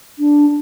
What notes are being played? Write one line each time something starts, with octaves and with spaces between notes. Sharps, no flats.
D4